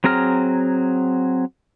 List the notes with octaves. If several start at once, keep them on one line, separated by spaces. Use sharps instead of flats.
F#3 C4 G#4 A#5 F6